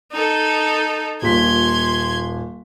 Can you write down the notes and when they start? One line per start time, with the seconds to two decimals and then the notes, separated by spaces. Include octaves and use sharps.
0.12 D#4 A4
1.22 D#1 A#2 C6 G#6 B6